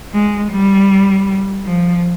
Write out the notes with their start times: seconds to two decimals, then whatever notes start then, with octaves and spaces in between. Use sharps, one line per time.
0.13 G#3
0.52 G3
1.66 F3